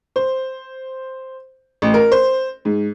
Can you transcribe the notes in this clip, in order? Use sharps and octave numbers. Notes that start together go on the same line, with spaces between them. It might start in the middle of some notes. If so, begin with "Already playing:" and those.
C5
A1
A#4
C5
G#2